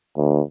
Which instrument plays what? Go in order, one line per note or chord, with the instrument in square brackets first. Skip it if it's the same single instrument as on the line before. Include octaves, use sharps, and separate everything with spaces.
[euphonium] D2